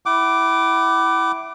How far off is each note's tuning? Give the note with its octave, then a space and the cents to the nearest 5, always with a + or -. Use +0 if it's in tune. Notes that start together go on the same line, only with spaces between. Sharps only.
E4 +0 F#5 +40 D6 +0